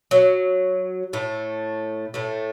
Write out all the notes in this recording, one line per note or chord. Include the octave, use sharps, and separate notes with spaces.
F#3
A2 A3
A2 A3